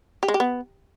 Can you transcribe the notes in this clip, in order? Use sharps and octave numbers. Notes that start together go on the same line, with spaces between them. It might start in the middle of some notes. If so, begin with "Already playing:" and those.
G4
G#3
G4
B3